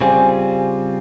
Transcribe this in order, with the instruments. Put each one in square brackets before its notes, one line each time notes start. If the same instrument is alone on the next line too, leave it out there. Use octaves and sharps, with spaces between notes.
[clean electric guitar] C#3 G3 C4 F4 [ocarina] G#5